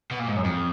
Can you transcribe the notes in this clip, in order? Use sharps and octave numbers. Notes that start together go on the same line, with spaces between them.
B2
A#2
G#2
F#2
F2